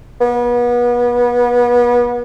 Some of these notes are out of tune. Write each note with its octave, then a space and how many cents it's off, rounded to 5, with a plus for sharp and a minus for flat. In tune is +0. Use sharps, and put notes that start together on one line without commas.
B3 -35